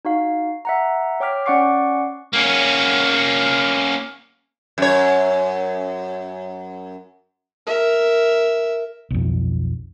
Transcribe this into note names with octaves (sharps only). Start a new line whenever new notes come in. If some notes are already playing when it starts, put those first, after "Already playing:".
D#4 F#4 F5
E5 F#5 A#5
C#5 G5 D6 F6 B6
C#4 D5 F#5 C#6 D6 C7
A#3 C#4
F#2 C#5
A#4 E5
B1 F2